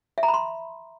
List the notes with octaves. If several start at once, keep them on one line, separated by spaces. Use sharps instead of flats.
E5
A#5
B5
C6